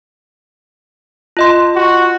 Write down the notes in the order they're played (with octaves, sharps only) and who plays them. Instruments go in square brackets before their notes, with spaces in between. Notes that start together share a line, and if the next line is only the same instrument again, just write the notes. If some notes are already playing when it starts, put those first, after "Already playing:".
[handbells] F4 D#5 C6
[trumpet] F#4